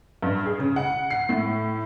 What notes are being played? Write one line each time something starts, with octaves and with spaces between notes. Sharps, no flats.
G2
G#4
C#3
F#5
C7
A2